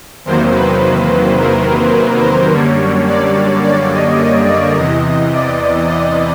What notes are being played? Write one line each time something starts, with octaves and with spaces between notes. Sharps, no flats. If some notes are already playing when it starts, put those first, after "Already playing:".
E2 C3 D#3 F#3 A#3 C5
B4
A#4
B4
C5
F#2 D3 G3 A#3 C#5
D5
D5
D#5
D#5
D5
E2 C3 E3 D#5
D5
D#5